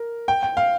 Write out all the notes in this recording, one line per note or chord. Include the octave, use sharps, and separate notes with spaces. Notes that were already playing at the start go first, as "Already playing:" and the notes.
Already playing: A#4
G5
G5
F5